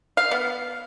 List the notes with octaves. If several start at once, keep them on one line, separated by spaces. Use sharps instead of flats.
F5
B3